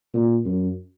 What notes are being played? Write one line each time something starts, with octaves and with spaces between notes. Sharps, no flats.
A#2
F#2